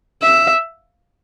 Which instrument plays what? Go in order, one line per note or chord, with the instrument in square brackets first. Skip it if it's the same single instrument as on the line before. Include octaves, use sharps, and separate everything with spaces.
[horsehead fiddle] E5